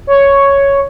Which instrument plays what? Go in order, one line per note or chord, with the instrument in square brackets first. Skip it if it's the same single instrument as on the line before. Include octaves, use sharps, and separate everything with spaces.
[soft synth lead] C#5